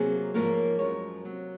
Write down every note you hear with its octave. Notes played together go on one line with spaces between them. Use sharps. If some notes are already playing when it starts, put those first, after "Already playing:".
Already playing: C3 F#3 A#3 G#4 C5
G#2 F3 A#3 A#4 C#5
F#2 F3 G#3 A#4 C#5
C3 F#3 A#3